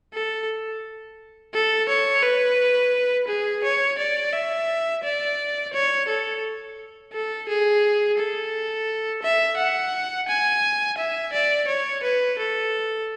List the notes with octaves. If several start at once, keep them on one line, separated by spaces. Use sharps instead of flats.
A4
A4
C#5
B4
G#4
C#5
D5
E5
D5
C#5
A4
A4
G#4
A4
E5
F#5
G#5
E5
D5
C#5
B4
A4